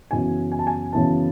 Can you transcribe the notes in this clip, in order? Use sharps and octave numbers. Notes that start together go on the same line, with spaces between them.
F#2 C#3 E3 B3 G#5
G#5
A5
G#5
F#2 C#3 E3 B3 A5